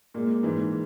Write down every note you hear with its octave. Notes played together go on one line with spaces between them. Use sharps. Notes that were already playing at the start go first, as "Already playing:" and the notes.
A#2 G#3 A#3
G#2 E3 G#3